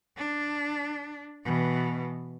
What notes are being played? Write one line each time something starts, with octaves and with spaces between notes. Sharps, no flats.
D4
B2 E3